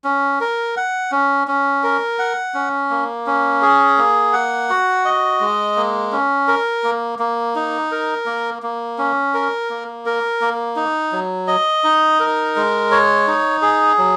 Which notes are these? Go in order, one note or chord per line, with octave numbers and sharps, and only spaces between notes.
C#4
A#4
F#5
C#4
C#4
A#4
F#5
C#4
A#3
C#4
G#4
A#3
F#5
F#4
D#5
G#3
A#3
C#4
A#4
A#3
A#3
D#4
A#4
A#3
A#3
C#4
A#4
A#3
A#4
A#3
D#4
F#3
D#5
D#4
A#4
G#3
C#5
D#4
G#4
F#3